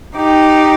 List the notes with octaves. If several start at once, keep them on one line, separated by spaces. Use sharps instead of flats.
D#4 G4